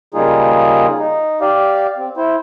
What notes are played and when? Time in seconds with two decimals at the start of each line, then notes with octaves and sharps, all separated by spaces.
0.14 C#3 G3 A#3 D#4 F4 G#4
0.98 D#4
1.41 G4 D5 F5
1.97 C4
2.17 E4 C5